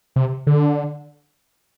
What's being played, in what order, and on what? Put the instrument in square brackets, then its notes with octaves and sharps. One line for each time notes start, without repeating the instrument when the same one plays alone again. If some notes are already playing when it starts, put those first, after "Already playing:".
[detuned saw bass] C3
D3